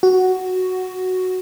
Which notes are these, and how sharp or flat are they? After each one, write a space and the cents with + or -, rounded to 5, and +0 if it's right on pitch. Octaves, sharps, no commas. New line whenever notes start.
F#4 +5